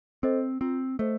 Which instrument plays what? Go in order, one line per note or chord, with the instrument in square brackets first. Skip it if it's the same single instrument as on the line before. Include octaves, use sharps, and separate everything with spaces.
[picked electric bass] C4 [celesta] A4 C5 D#5
[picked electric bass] C4 [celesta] F4
[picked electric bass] A3 [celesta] A4 C5 D#5